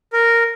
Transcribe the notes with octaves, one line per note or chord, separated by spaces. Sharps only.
A#4